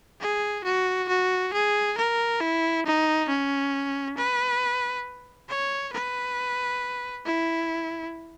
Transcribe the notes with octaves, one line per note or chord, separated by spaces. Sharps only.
G#4
F#4
F#4
G#4
A#4
E4
D#4
C#4
B4
C#5
B4
E4